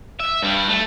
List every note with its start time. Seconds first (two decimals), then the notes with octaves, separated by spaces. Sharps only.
0.20 E5
0.42 G2 G3
0.69 A3